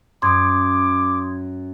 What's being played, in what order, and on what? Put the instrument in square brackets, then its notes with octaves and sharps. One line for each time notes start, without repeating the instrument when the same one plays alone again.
[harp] F#2 [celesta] C6 D#6 G#6 [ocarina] D6